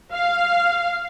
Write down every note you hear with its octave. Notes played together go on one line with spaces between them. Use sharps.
F5